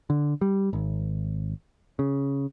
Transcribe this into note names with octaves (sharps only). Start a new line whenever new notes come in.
D3
G3
G#1
C#3